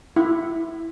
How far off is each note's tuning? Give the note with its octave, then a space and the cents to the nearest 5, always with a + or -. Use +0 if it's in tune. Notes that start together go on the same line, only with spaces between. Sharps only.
E4 +10